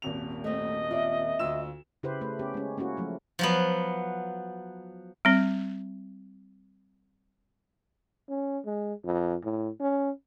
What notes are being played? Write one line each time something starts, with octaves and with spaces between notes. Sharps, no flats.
D#1 G#1 F7
A3 C4 D#5
F4 D5 E5
D2 F4 E6 E7
C#3 E4 G4 B4 C5
A3 B4
B3 C#4 G4
G#3 C#4
A#3 C#4 E4 F#4
F3 F#3 A3
F3 F#3 B3
G3 C4
C#4
G#3
F2
A2
C#4